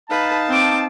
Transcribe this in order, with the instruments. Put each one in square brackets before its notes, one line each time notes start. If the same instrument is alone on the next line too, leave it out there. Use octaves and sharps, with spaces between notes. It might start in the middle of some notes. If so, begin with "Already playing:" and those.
[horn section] D#4 F5 A5 [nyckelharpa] B4
[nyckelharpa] C4 D6